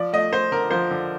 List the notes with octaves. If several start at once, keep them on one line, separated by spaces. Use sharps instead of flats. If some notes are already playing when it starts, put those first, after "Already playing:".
Already playing: F3 D5
A3 D#5
A3 C5
D3 A#4
F3 C5
D3